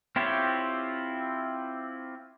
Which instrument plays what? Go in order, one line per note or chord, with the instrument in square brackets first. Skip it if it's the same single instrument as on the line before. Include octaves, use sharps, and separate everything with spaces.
[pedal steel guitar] C4 E4 F4 G4 C#5